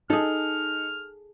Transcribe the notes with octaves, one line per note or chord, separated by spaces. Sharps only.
D#4 G#4 A4 F6